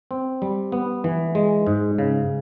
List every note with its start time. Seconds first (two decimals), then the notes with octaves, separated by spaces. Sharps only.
0.11 C4
0.42 G3
0.72 B3
1.04 E3
1.35 G#3
1.67 G#2
1.98 C#3